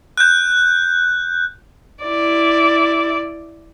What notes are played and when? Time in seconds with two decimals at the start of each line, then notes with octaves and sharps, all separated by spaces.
0.18 F#6 G6
2.03 E4 D5